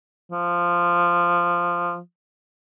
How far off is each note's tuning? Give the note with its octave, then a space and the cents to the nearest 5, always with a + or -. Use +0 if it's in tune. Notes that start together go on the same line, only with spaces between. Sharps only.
F3 -5